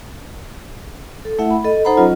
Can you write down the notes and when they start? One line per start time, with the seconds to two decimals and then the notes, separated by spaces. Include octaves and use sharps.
1.25 A4
1.39 A3 E4 E5 F#5
1.50 B5
1.64 A4 D#5
1.85 D#4 A4 C5 F#5 A#5 B5
1.97 F#3 C#4 F4 D#5